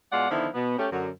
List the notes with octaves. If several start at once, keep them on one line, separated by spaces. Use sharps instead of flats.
B2 G#3 F4 D5 F#5
D3 D#3 F3 B3 D#4 E4
B2 B3
A3 C#4 G4
F#2 D3 F#3